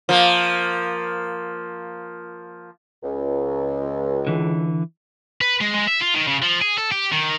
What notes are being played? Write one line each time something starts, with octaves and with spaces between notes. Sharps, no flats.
F3 A#3
C#2
D3 E3
B4
G#3
G#3
E5
F4
D#3
C#3
F3
G#4
A4
G4
D#3